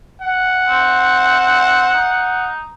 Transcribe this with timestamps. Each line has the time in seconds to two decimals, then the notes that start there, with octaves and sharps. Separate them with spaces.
0.22 F#5
0.68 C4
1.94 D#4